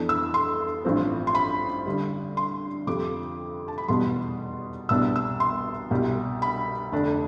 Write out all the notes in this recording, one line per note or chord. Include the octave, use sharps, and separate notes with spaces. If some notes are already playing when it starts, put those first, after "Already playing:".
Already playing: F2 E3 B3 D4
E6
C6
A1 G2 F3 C4
C6
B5
G2 D3 G3
C6
F2 C3 F3 D6
A5
B5
F1 E2 B2 G3 B3 C6
C2 B2 B3 D4 E6
E6
C6
C2 B2 G3
B5
F1 F2 D3 A3 D4